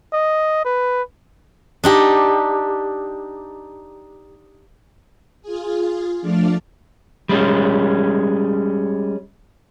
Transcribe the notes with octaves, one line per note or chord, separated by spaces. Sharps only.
D#5
B4
D4 D#4 G4
F4 G#4
F3 A3 D4 D5 F5
G3 G#3 C#4